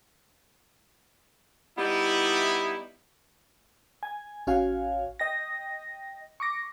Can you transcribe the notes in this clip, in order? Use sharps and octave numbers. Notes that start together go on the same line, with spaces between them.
G3 B3 D#4 E4
G#5
A1 C#4 F#4 C#5 F5 G#5
D#5 G5 A#6
C#6 D6 A#6